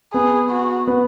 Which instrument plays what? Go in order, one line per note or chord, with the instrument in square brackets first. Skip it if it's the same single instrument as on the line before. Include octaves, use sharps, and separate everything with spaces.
[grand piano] B3 [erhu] G#4
[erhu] F#4
[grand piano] B3